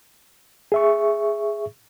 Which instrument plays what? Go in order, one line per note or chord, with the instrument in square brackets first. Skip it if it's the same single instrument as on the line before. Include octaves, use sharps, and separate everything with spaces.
[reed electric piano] G#4 E5 C#6